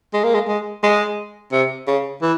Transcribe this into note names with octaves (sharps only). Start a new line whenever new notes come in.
G#3
A#3
G#3
G#3
G#3
C3
C#3
E3